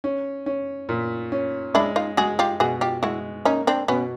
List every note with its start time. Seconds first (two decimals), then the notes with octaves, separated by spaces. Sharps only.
0.04 C#4
0.46 C#4
0.89 A#2
1.32 C#4
1.74 G#3 D4 E4
1.96 D#4 F4
2.17 G#3 F#4 G#4
2.39 F4 G4
2.60 B2 F#4 G#4
2.81 F4 G4
3.03 G#3 E4 F#4
3.45 A#3 C#4 D#4
3.67 C4 D4
3.88 B2 B3 C#4